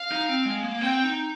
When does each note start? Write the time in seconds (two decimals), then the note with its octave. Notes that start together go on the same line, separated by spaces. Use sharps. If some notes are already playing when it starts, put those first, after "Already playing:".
Already playing: F5
0.12 D#4
0.29 C4
0.45 G#3
0.63 A#3
0.81 C4 G5
1.04 D#4